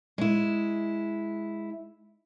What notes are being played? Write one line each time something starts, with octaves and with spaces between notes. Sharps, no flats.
G#3 E4